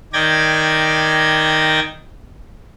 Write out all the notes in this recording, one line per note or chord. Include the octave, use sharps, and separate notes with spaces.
D#3 D5 G5 G#6 A#6